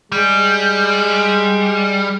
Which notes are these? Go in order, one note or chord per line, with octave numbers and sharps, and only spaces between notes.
G3 G#3